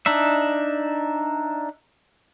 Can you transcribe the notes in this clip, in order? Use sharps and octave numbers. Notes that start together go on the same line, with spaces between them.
D4 D#4 E5